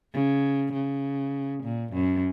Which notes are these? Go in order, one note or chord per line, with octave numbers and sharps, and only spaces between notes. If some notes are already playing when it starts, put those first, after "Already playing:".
C#3
C#3
A#2
F#2